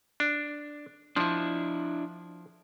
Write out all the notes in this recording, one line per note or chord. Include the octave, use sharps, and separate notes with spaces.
D4
F3 D4 E4